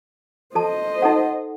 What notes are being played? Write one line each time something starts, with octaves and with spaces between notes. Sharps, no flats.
A4 C5 D#5 A5
D#4 A4 F#5